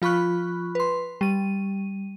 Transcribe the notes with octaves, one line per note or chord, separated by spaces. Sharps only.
F3 F4 B5 C#6 F#6
B4 C6
G3 D#7